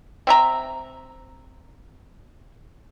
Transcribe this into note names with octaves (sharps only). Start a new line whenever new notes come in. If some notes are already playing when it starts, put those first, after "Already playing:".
C4 E5 A#5